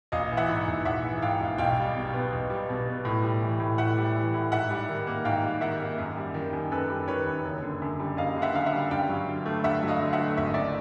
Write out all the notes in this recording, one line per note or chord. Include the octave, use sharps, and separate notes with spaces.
A#1 D#5 F5
E3
E5 F#5
G#2
A#1
A#1 E5 F#5
E3
G#2 F5 G5
A#1
B1 F5 G5
G3
B2
B3
B1
G3
B2
B3
A2
G3
E3
A2
A2 E5 F#5
G3
E3
A2
G#2 E5 F#5
G3
D#3
A#3
G#2 F5 G5
G3
D#3 E5 F#5
A#3
F#2
G3
D#3
F#2
F#2 A4 B4
G3
D#3 B4 C#5
F#2
F#1
D3
F#2
G3
F#1 D#5 F5
D3
E5 F#5
F#2 F5
E5 F#5
G3
G2 F5 G5
F#3
D3
A3
G2 E5 F#5
F#3
D#5 F5
D3
E5 F#5
A3
G#1 E5
D#5
C#3 D5 E5